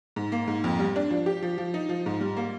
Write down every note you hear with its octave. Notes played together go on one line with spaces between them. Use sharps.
G#2
A#3
G#2
F2
G3
D4
F3
G4
F3
F3
D#4
F3
G#2
G3
A#3